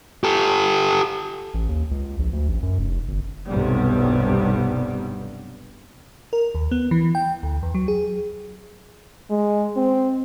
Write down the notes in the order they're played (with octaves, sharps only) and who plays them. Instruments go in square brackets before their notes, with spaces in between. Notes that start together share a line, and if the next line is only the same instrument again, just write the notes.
[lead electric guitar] G4 A4
[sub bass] A1
D#2
C#2
A#1
D2
A1
F#2
F1
G1
[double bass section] F1 B1 G2 C3 G3 B3
[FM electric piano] A#4
D#2
B3
E3
G5
D2
E2
F#3
G#4
[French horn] G#3
C4